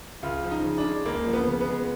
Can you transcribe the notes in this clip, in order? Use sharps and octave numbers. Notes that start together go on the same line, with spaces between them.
C#2 F4
F3
D#4
C#3
D4
G#3
C#2 A#3
F3
B3
C#3
B3
G#3